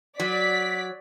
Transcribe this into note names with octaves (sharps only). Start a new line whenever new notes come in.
F#3 D5 B6